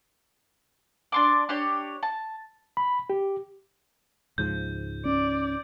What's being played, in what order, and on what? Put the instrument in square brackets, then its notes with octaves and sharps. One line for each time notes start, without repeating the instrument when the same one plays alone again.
[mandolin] D4 C6 D6
D4 G4 C#5
A5
[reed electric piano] B5
G4
[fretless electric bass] C#2 G#2 F3 [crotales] G6
[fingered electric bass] C#4 [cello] D5